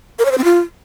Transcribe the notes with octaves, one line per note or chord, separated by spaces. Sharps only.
A#4
C#5
C5
C4
F4